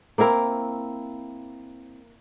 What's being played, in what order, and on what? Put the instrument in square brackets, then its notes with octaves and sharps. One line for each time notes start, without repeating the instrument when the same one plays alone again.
[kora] A#3 C4 E4 A#4